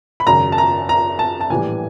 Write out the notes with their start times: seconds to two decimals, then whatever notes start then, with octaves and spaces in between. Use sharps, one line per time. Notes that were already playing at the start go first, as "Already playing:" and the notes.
0.20 B5
0.26 G#1 F#2 C#3 A#5
0.52 A5
0.58 A#5
0.89 A#5
1.19 A5
1.41 A5
1.50 A#1 A2 E3 G3 G#5